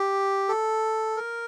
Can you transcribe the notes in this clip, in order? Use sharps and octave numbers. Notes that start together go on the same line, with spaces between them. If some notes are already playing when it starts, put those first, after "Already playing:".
Already playing: G4
A4
A#4